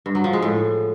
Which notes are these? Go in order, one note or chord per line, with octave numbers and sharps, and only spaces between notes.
G2
F#3
F3
G#3
A2